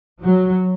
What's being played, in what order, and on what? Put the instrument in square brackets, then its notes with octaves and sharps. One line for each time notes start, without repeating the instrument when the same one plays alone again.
[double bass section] F#3